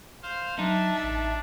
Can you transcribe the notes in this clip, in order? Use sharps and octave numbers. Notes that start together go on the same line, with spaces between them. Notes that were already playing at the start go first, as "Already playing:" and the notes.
C5 F5
F#3 D4 D#4 E5 A5
A1